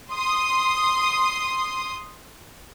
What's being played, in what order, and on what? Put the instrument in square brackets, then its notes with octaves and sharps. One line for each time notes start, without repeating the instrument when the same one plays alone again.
[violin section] C6 D#6